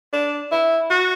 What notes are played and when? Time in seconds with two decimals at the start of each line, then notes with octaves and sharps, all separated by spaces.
0.13 D4
0.52 E4
0.90 F#4